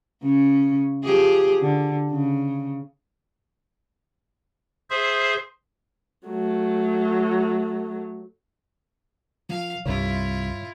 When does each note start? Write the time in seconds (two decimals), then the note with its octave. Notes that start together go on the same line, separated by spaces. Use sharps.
0.22 C#3 C#4
1.04 F3 G4 G#4
1.62 D3
2.11 C#3
4.90 G#4 C5 E5 C6
6.27 F#3 A3
9.49 F3 F5
9.86 C2 G2 E4 F4 C#5